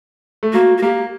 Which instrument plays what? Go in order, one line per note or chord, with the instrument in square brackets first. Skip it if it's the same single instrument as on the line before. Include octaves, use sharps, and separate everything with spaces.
[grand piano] A3
[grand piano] A#3 [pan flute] F#4
[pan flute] F#4
[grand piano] A#3 [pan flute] G4